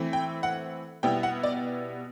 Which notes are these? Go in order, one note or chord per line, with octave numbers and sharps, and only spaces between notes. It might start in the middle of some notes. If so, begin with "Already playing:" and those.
Already playing: E3 A3 C4
G5
F#5
B2 G3 B3 E4 G5
F#5
D5